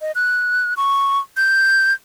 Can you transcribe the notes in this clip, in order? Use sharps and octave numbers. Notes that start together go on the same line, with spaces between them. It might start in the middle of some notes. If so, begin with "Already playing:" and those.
D#5
F#6
C#6
G6